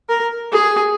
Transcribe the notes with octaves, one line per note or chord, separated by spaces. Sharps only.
A#4
G#4